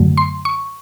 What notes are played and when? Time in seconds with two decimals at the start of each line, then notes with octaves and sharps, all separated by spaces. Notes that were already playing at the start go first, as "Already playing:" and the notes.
Already playing: F#2 D3 F#3 A3
0.17 C6
0.45 C#6